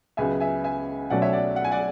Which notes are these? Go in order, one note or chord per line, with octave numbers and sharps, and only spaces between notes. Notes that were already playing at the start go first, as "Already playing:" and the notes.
C#2 C#3 F#3 B3 E5 G#5
E5 G#5
E5 G#5
B1 B2 F#3 A3 C#4 D5 F#5
C#5 E5
D5 F#5
F#5
G#5
D5 F#5